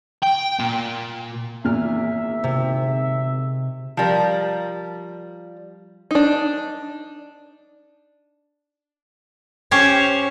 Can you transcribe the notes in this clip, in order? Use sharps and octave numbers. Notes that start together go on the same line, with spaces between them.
G5
A#2
G#1 E2 A#2 E5 F6
C3
F3 G3 A#4
D4 D#4
C#4 G4 C5 C#5